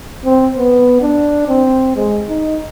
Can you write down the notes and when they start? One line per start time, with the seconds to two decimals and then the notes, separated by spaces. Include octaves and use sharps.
0.25 C4
0.57 B3
1.01 D4
1.48 C4
1.96 G#3
2.29 D#4